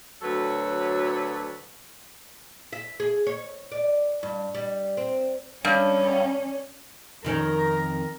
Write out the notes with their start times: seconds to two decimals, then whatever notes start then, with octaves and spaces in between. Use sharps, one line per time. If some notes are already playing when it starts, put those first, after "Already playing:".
0.22 D2 F#3 A4 B4 C#5
2.73 E5
3.00 G#4
3.27 C#5
3.72 D5
4.23 G2
4.55 G3
4.97 C4
5.65 G2 C#4
7.25 F2 D#3 C#4 A#4